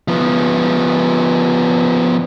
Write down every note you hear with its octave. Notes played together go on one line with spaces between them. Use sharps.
F3 B3